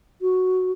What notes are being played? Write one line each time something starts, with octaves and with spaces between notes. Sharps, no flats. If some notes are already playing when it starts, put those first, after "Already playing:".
F#4